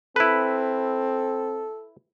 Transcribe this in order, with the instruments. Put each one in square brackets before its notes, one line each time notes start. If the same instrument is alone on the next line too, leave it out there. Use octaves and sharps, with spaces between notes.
[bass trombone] C4 [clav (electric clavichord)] E4 B4 [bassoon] A4